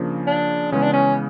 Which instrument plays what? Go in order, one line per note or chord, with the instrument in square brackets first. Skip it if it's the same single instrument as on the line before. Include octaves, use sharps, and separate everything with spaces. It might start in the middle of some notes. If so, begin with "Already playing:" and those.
Already playing: [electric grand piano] C#3 F3 A#3 D4
[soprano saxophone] D4
[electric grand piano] C#3 E3 G#3 B3 [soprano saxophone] C#4
[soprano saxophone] D4
C#4